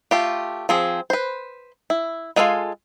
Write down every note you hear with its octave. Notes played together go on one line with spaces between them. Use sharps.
A3 F4 G4
F3 C4 G#4
B4 C5
E4
G#3 F4 A4 F5 G#5